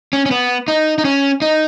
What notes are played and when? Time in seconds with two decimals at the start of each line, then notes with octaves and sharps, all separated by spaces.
0.13 C#4
0.26 C#4
0.31 B3
0.68 D#4
0.98 D#4
1.05 C#4
1.42 D#4